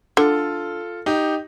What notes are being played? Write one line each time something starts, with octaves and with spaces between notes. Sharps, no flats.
D3 F4 A4
D#4 G4